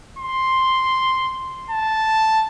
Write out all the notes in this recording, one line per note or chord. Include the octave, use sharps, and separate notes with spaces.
C6
A5